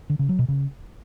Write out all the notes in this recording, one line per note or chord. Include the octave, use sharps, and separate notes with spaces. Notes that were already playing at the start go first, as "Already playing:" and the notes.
D3
C#3
F#3
B2
C#3